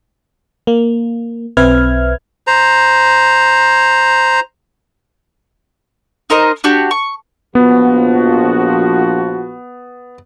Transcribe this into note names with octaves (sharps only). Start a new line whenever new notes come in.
A#3
B1 C4 B4 E5 F6 G#6
C5 A#5
D#4 A#4 C5 D#5
D4 F#4 G4
C#6
A#1 F3 B3 F#4